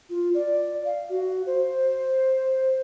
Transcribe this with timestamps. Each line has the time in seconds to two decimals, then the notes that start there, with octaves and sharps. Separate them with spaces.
0.10 F4
0.34 D5
0.86 F5
1.09 F#4
1.47 C5